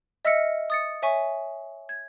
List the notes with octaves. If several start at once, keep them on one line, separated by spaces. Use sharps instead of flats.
D#5 E5 E6 F6 A#6 C#7
D#6 A6 C#7
C#5 E5 G#5 C#6
G#6